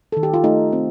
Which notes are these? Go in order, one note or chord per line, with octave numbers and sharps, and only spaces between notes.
D#3 A4
G4
F4
A3 D#4
C4